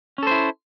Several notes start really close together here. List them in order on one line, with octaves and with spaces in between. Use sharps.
C#4 A4 C5 E4